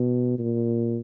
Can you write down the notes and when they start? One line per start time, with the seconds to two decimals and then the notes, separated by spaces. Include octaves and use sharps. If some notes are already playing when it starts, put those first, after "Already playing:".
Already playing: B2
0.38 A#2